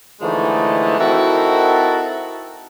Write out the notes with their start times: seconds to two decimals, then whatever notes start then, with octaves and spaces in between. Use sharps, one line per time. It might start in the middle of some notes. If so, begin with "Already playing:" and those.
0.21 D3 E3 F3 G#3 A3 D#4
0.99 C4 D#4 E4 F#4 A4 A#4